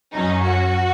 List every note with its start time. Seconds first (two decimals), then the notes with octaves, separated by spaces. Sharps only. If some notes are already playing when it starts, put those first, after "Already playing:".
0.15 F#2 F#3 C#4 D#4
0.43 F#4